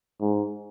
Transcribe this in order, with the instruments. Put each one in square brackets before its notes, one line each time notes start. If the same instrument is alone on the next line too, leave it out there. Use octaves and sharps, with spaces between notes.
[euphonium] G#2